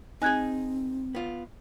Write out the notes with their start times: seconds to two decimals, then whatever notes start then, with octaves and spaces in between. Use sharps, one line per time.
0.22 C4 D#4 G#4 G#5 F#6 G#6
1.15 B3 F4